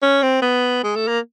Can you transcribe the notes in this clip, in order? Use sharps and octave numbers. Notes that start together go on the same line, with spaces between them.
C#4
C4
B3
G#3
A3
A#3